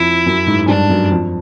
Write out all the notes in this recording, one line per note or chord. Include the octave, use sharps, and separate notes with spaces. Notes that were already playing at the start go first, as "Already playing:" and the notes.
Already playing: F2 E4
F#2
G#2
G2 D4
F#2
F2